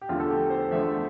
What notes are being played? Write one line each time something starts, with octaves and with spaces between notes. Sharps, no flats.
G4
E2 D3 F3 A3 F4
A4
G4
C5
E2 D3 F3 A3 E5